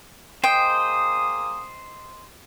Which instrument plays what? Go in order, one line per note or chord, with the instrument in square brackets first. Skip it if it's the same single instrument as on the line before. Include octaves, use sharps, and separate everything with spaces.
[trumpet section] A#3 G#4 D#6 [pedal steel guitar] C5 D#5 [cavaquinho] G5